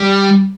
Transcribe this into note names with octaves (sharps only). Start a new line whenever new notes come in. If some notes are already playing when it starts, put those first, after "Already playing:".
Already playing: G3